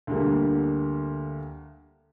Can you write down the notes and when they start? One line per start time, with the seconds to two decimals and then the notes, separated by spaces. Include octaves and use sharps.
0.07 D2 D3 G3 A#3